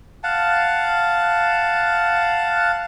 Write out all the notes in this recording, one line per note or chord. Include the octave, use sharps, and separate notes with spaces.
F5 F#5 A5